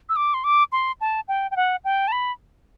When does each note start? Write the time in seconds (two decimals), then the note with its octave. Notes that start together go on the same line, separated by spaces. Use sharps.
0.09 E6
0.16 D6
0.34 C6
0.44 D6
0.72 C6
1.01 A5
1.28 G5
1.51 G5
1.56 F#5
1.85 G5
2.08 A5
2.12 B5